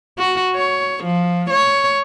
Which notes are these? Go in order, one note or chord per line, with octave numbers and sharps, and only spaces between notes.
F#4
C#5
F3
C#5